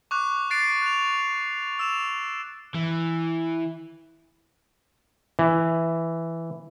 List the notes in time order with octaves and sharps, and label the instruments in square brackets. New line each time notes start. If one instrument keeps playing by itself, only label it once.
[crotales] C#6 D6 F#6
D6 F#6 A6 C7 D7
F#6 F7
E6 E7 F7
[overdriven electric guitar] E3
[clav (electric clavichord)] E3